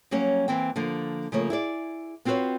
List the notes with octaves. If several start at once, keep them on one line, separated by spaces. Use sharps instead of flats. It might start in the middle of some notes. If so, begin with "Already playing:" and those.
F#3 G3 A#3 C#4 C#5
E3 A#3 C4 G5
D3 F3 A#3
C#3 F3 A3 A#3 C#5
E4 G#4 D5
B3 C4 F4 F#4 B4 C#5